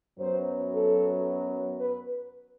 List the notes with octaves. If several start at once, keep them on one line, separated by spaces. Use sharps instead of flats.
F#2 F#3 B3 C5
A4
B4